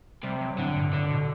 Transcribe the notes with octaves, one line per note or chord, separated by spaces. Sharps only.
C3 G3
F#3
A2 D3
G2
A2 D3
B2